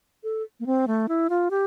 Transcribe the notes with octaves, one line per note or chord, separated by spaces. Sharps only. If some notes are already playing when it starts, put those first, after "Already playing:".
A4
A#3
C4
A3
E4
F4
G4